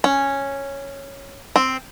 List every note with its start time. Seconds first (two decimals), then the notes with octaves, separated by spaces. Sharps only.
0.04 C#4
1.56 C4